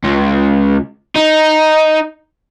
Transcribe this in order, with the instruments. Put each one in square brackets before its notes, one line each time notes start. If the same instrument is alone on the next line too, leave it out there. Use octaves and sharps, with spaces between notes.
[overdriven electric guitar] C#2
D#4